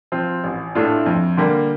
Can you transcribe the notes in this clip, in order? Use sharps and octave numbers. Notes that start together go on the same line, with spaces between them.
F3 C4 F4
A1
A2 A3 D4 F4
F2
D3 G3 A#3